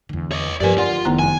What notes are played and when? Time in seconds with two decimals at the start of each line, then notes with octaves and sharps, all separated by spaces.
0.09 E2 D3
0.32 C#5 D#5
0.61 G2 F3 G4 A#4 B4 D5 G#5
0.78 D3 F4 D5 F#5 C6
1.05 F1 D#3 B3 E4 A#5
1.19 G#5